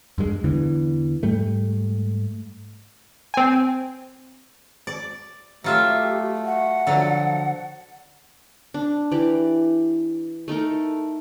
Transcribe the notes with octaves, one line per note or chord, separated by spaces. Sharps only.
E2 G2 F#3 G#3
E2 D3 E3
G#2 G3 A3
C4 G#5
D5
F#3 A3 F4 G4 E5
F#5
D3 F3 F#3
D4
E3 G4 D5
A3 D#4 A4 A#4